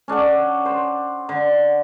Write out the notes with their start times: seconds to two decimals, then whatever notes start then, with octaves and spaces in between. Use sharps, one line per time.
0.08 C#4 D4 A4 F#5
0.66 C5
1.29 D3